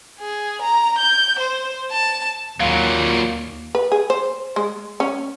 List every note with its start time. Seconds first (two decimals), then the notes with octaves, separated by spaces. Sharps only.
0.19 G#4
0.61 A#5
0.98 G6
1.39 C5
1.91 A5
2.60 D#2 A#2 F#3 F5
3.75 B4
3.92 G#4
4.10 C5
4.56 G#3
5.00 C#4